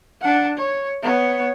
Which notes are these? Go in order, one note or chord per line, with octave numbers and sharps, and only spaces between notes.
D4 F#5
C#5
B3 C#5